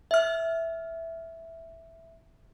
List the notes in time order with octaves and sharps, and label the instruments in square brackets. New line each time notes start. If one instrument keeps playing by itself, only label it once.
[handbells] E5 F6